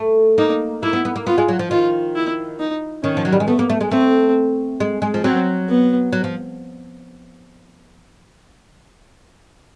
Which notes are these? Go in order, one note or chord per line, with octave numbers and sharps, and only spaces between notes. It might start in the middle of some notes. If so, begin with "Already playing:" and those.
Already playing: A3
A#3 D#4
A#3 E4
B3
B3
A#3
B3 F4
G#3
F#3
F3
D#3 F4
E4
D#4
D#3 C#4
F3
F#3
G3
G#3
A3 B3
A#3
A3
G#3
A3 C4
G#3
G#3
F3
F#3 C4
B3
F#3
F3